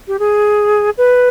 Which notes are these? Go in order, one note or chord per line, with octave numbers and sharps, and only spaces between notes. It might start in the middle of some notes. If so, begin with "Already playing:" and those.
G4
G#4
B4